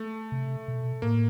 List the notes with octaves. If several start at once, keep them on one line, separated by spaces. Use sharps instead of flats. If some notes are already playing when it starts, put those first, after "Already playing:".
Already playing: A3
C3
B2
A2 A#3